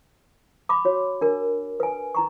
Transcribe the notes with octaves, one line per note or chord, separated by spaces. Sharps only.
B5 D6
F#4 C#5
D4 A#4
B4 G#5
D#4 A#5 C#6